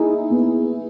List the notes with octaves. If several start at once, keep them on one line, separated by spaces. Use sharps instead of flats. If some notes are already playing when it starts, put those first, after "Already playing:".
Already playing: D#4 E4 G#4
B3